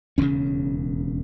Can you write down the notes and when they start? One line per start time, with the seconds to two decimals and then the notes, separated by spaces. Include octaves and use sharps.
0.18 E1 D#2 C#3 C#4